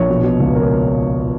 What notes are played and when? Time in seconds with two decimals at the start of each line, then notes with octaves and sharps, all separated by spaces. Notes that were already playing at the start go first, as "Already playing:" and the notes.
Already playing: A#1 C#5
0.09 B2
0.23 B2
0.40 C#2
0.55 A#4